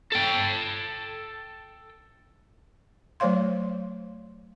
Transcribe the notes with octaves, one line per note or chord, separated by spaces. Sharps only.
A4 G5
F#3 A3 C5 C#5 F5 C6